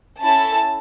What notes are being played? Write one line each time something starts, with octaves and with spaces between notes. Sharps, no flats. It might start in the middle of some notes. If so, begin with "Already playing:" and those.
C#4 E4 A4 A5